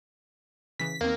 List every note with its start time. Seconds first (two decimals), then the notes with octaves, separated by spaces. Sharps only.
0.79 C#3 E3 B6
1.01 E2 D#3 A#3 C4